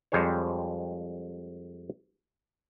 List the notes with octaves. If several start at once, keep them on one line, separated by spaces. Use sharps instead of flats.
F2 G3 G#3 C5 C#5